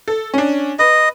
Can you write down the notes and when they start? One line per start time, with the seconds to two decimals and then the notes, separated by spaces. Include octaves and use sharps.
0.08 A4
0.34 C#4 D4
0.79 B4 D#5